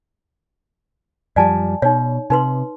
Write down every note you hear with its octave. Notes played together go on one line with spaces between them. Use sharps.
F#2 F3 G3 D5 G#5 A5
B2 D#4 C#5
C3 D#4 B4 C6